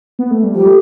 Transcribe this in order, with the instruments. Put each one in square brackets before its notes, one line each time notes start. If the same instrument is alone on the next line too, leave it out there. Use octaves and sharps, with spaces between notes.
[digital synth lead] B3
A3
G3
[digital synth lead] F3 [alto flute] G4
[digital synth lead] A3